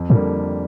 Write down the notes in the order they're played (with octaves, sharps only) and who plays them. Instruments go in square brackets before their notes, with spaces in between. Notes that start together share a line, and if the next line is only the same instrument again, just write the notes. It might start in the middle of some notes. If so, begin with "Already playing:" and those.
Already playing: [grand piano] F2
[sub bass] A2 [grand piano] D3 G3 A#3